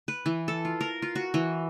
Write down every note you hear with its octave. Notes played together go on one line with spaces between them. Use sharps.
B4
E3
A4
F4
A#4
F4
F#4
E3